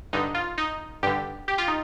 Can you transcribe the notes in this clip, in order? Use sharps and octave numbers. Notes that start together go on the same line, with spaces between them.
G2 D3 D#4
F4
D#4
G2 D3 G4
G4
F4
D#4